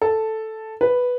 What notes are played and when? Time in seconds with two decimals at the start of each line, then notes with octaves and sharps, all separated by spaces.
0.02 A4
0.81 B4